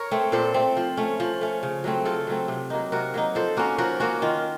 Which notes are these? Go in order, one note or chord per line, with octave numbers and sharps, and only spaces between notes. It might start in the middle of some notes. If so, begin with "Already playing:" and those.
Already playing: A#4 C#5
A3 C4
A#2 A4 C5
A3 C4
F3
A3 C#4
F3
A3 C#4
C#3
F#3 A3 C4
C#3 F4 A4
F#3 A3 C4
C3
F#3 A#3 D#4
C3 F#4 A#4
F#3 A#3 D#4
F3 A4 C5
A#3 C#4 F#4 A#4
F3 F#4 A#4
A#3 C#4 F#4
D#3 F4